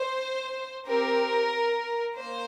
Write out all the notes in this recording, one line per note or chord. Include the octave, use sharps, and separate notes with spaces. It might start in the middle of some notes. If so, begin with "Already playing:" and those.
Already playing: C5
C4 G4 A#4
A#3 C5